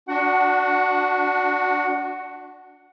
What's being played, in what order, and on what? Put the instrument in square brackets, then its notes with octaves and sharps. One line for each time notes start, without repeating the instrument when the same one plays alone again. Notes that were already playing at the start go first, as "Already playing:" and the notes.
[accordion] D4 F#4 [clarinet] F#5